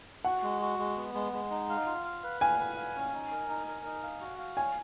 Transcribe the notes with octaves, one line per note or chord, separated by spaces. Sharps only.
F#4 F#5
G#3
F#4
G#3
B3
G#3
G#3
D#4
F5
F4
F5
B4
F5 G#5
B4
F5
C#4
D#4
A#4
D#4
A#4
D#4
F5
F#4
F5
C#5 G#5